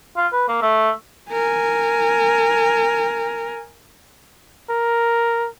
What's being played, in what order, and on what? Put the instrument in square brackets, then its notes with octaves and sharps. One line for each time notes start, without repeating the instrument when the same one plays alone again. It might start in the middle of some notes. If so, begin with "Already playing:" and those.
[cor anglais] F4
B4
A#3
A3
[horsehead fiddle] A#4 G#5
[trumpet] A#4